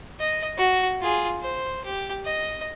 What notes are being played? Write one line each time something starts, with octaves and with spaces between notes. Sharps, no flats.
D#5
F#4
F4 G#4
C5
G4
D#5